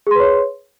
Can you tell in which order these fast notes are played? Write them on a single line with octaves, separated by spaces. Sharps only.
G#4 C6 B4 C#5